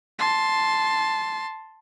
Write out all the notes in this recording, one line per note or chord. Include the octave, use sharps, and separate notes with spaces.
A5 C6